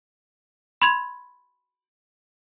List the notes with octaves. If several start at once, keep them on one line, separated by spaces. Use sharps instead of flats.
B5 C6 G#6 F7